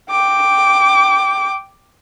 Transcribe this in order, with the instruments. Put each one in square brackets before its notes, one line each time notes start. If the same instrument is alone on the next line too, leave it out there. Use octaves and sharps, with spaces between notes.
[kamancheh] G5 D6